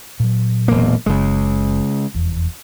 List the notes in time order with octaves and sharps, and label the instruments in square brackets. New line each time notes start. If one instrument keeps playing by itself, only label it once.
[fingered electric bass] A#2 F#3
[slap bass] E1 A#3
[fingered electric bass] F#1 [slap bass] C#3 G#3
[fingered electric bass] F1 E2